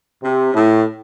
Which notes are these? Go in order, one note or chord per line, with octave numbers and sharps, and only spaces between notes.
C3
A2